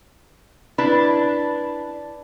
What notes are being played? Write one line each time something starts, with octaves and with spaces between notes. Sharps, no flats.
D4 E4 B4